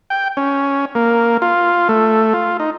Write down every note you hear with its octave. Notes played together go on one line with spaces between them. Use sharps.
G5
C#4
A#3
F4
A3
F4
D#4